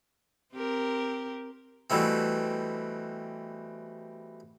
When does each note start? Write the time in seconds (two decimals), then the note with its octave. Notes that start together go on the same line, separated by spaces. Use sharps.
0.53 C4 G4 A#4
1.90 B2 E3 G3 A3 C4